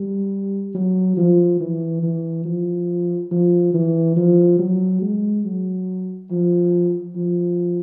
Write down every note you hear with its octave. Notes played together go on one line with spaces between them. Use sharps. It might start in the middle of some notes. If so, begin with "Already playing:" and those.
Already playing: G3
F#3
F3
E3
E3
F3
F3
E3
F3
F#3
G#3
F#3
F3
F3